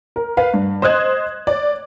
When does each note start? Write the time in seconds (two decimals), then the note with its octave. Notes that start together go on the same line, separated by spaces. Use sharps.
0.16 A#4
0.37 B4 F5
0.54 G2
0.82 C5 D#5 D#6 F#6 G#6
1.47 C#5 D5